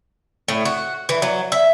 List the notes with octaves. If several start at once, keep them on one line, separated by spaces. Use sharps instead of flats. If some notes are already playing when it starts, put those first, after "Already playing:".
A2
F#4
E3
F#3
E5